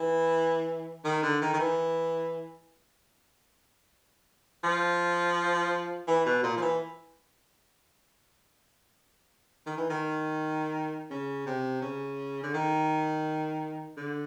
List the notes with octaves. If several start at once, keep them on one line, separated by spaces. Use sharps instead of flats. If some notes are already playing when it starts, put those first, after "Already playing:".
Already playing: E3
D#3
D3
D#3
D#3
E3
F3
E3
B2
A#2
F3
E3
D#3
E3
D#3
C#3
C3
C#3
D3
D#3
D3